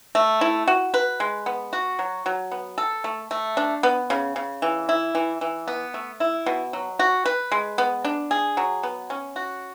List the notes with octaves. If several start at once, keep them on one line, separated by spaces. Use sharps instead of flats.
A3
E4
F#4
B4
G#3
B3
F#4
F#3
F#3
B3
A4
A3
A3
D4
B3
C#3
C#3
E3
E4
E3
E3
B3
A3
E4
B2
F#3
F#4
B4
G#3
B3
D4
G#4
F#3
B3
C#4
F#4